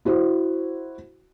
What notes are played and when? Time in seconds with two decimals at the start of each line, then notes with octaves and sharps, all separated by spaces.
0.05 E4 F#4 C5